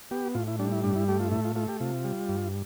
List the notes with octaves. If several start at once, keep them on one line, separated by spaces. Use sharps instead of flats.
B3 G4
A2 F4
E4
G3 D4
E4
G2 D4
E4
A3 G4
F4
A2 E4
F4
A3 F4
G4
C3 F4
G3
G2